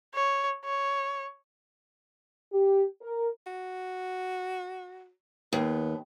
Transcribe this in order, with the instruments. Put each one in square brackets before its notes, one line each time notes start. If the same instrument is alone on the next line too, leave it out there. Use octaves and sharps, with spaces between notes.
[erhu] C#5
C#5
[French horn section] G4
A#4
[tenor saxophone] F#4
[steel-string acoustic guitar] D#2 [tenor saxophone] B3